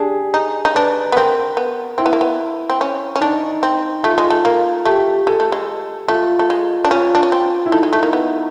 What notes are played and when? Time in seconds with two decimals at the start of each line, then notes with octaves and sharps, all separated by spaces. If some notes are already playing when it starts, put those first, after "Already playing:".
Already playing: D4 G4 G#4
0.34 D#4
0.65 D#4
0.75 D4 B4
1.12 B3
1.16 C4 A#4
1.57 B3
1.98 C4 E4
2.06 B3
2.13 A#3
2.21 B3
2.70 C4
2.81 C#4
3.16 C#4
3.21 D4 D#4
3.63 C4
4.03 A3 F4
4.18 G#3
4.30 A3
4.45 A#3
4.85 A3 G4
5.27 G#3 A4
5.40 A3
5.52 G#3
6.08 A3 F4
6.39 A3
6.50 G#3
6.85 D4
6.91 C#4 F4
7.15 D4
7.23 C#4
7.32 C4
7.66 E4
7.72 A3 D#4
7.83 G#3
7.93 A3 E4
8.03 A#3
8.13 B3